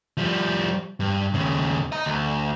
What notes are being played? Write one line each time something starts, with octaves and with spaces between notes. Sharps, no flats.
F3 G3
G2
D#2 C#3
D#5 A#5
D2